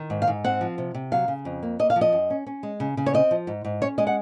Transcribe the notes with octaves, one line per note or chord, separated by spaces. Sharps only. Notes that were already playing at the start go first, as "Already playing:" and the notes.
Already playing: D#3
G#2
F5
G#2
C4 F#5
F3
C3
C3
F#3 F5
C#3
F2
A#3
A#3 D#5
F5
F3
D#5
F#2
C#4
C#4
G#3
C#3
C#3
C#5
C4 D#5
F3
G#2
G#2
C#4 C#5
G#3 D#5
F#5